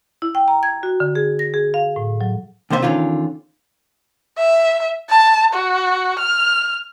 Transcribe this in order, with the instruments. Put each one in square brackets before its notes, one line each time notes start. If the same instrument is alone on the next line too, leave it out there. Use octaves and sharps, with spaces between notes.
[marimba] E4
G5
A#5
G#6
F#4
D3
G#4
A#6
G#4
F5
A2
F#3
[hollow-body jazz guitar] D#2 C3 A#3 C5 D#5 E5
E2 G#2 D3 D#3 C#4 F4
[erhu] E5
A5
F#4
F6